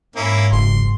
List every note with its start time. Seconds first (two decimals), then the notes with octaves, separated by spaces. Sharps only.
0.16 G#2 A#3 C#4 E4
0.52 F#1 C6